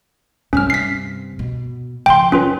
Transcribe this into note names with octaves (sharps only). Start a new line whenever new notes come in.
G2 C3 C#4 F6
B6 C7
B2
C#3 F3 G5 C6
F#2 C#4 F4 B4